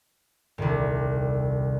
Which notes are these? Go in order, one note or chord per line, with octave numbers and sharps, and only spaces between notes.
D#1 C2